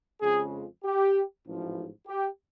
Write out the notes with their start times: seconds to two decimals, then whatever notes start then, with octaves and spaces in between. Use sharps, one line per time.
0.21 F2 C#3 F3 G#3 G#4
0.84 G4
1.45 A1 G#2 F3
2.07 G4